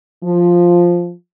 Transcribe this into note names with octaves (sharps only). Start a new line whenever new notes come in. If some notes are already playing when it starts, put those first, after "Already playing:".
F3